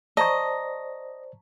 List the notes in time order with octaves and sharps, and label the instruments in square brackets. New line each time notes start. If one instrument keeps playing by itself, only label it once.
[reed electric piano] C5 D5 [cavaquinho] D#5 [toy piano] A5 A#5 C#6